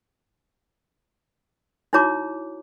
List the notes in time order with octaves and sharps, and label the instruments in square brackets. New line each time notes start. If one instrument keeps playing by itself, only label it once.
[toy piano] D#4 E4 F#4 C#5 A#5 D6